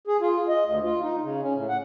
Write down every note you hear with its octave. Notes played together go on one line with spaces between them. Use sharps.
G#4
F4
D#5
D2
F4
D#4
C#3
C#4
A2
F#5